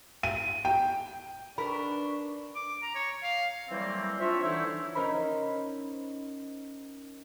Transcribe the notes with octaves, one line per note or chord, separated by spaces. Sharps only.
D#7
G5
D4 D#4 A#4 B4 B5 C#6
D6
A#5
C#5
F5
E3 F#3 G3 A3 A#3 C4
C4 D4 F4 C#5 E5
D3 E3 D#4 E4 C5 C#5
C#4 D#4 A#4 C5 B5